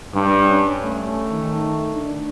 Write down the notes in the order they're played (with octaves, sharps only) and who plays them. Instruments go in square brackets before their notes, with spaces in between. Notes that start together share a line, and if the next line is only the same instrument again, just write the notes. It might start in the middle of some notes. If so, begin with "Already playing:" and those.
[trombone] G2 [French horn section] G3 C#4 D4
[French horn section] C#4
[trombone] A3
[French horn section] D#3
D4